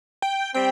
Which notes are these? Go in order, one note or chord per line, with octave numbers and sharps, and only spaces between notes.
G5
G3 C4 G5